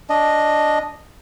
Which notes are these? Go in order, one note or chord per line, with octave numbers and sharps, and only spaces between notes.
D4 D#5